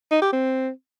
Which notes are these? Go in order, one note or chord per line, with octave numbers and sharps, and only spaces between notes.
D#4
G4
C4